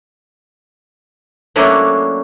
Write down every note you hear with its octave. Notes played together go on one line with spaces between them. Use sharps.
F#3 A3 A#3 C#4 D4 E4